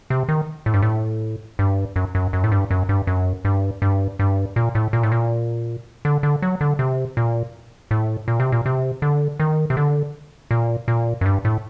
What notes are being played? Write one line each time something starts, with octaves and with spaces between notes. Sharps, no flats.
C3
D#3
A2
G2
A2
G2
F#2
F#2
F#2
A2
G2
F#2
G2
F#2
G2
G2
G2
A#2
A2
A#2
A2
A#2
D3
D3
F#3
D3
C3
A#2
A2
A#2
C3
A#2
C3
D3
D#3
C3
D3
A#2
A#2
F#2
G2
A2